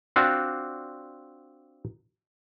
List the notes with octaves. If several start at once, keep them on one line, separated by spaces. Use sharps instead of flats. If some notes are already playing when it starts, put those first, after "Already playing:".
C4 D4 F4 F#4 D5